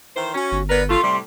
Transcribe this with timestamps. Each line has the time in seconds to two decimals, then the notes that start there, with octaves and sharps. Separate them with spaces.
0.17 D#3 E3 C5
0.35 C#4 F#4
0.52 G1
0.70 B3 A#4 B4 D5
0.90 A3 F4 C6
1.03 A2 C3 G3